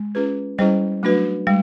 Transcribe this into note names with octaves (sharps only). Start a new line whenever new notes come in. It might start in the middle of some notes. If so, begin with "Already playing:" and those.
Already playing: G#3
C#4 F4 G#4 B4
G3 C#4 E4 G#4 C5 D#5
F#3 A3 D4 F#4 B4
G3 G#3